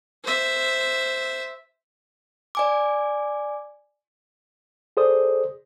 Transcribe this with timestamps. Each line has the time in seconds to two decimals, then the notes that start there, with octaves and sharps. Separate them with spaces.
0.24 C5 E5
2.55 D5 G#5 D6
4.97 G#4 A4 C5 D5 D#6